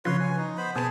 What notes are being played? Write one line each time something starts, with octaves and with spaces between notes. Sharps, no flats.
C#3 F3 B4 C#5 C6
G#5
D#4
B3 C5 B5
B2 B3 G#4 G#5 A5